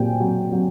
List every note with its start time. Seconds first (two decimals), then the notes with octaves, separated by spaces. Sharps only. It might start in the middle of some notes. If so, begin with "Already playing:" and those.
Already playing: A#2 F#3 G4 G5 G#5
0.20 F#3
0.52 F#3